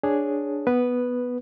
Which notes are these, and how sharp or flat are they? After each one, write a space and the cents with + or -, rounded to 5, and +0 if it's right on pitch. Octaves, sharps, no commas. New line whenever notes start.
D4 +0 G#4 +0 C#5 +0
B3 +0 B4 +0